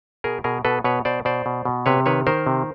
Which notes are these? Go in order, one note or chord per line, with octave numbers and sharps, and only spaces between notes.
B2 G#4 A#4
B2 G#4 A#4
B2 A4 B4
B2 B4 C#5
B2 C5 D5
B2 C5 D5
B2
B2
C3 B4 C#5
D#3 B4 C#5
D#3 A#4 C5
C3